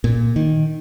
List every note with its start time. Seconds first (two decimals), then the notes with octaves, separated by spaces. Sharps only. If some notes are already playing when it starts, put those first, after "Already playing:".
0.04 A#2
0.36 D#3